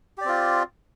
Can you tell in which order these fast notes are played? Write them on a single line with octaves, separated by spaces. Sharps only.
G4 D5 C4 F4